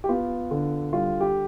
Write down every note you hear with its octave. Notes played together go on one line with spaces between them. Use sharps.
G4
B3 F4
D3
G3 F4
G4